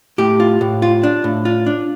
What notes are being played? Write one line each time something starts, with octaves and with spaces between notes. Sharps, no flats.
A2 G4
F4
A2
F4
D4
A2
F4
D4